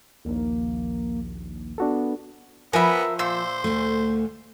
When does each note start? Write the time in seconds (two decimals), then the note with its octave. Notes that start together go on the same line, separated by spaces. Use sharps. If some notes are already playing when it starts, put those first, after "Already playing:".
0.25 A#1 D#2 A#3
1.78 B3 D4 F#4 A4
2.73 F3 B3 A#4 E5 G#5 B5
3.19 A#2 C5 E6
3.64 D2 A3